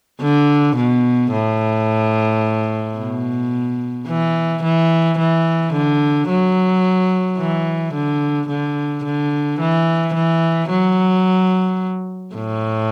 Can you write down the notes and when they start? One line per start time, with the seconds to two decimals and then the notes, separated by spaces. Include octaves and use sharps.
0.22 D3
0.77 B2
1.32 A2
2.97 B2
4.08 E3
4.63 E3
5.18 E3
5.73 D3
6.29 F#3
7.39 E3
7.93 D3
8.48 D3
9.04 D3
9.60 E3
10.14 E3
10.70 F#3
12.35 A2